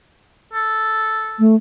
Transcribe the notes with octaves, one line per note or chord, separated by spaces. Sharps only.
A4
A3